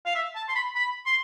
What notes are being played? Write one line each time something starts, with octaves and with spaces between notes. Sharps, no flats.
F5
E5
A5
C6
B5
B5
C6